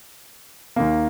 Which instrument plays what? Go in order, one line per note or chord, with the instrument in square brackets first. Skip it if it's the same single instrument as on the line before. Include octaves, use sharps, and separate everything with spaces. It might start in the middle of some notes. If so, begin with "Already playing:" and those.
[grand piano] D#2 D#3 A#3